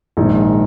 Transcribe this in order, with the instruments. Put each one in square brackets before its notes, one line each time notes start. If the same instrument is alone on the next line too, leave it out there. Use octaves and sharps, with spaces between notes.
[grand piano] A#1 G#2 D#3 G#3 D#4